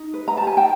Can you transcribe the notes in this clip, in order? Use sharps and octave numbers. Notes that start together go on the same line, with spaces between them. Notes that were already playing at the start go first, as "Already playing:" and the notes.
Already playing: D#4
B4
A#5
G4 A5
G#5
G5 A5